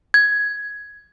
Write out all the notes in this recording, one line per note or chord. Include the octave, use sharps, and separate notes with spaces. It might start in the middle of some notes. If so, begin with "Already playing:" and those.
G#6